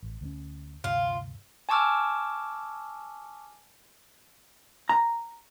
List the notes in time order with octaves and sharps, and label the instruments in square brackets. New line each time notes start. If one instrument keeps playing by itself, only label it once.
[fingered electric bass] A1
D2 G3 C#4
[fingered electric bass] D2 G2 C3 [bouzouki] F4
[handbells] G#5 A5 C#6 D6 E6 F6
[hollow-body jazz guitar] A#5